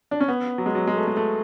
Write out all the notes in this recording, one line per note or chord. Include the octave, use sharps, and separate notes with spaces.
D4
C#4
B3
F#3
G#3
F#3
G#3
A3
G#3
A3